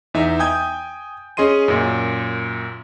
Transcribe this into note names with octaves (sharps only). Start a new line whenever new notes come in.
E2 D#4 E5
G5 G#5 D#6 G6 G#6
C#4 G#4 D#5 C6 D#7
F#2 A#2